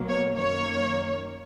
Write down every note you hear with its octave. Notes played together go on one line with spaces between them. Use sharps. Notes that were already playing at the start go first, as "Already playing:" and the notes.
Already playing: B1 B2 F#3 A#3
C#5
F#2 D#3 A#3 C#5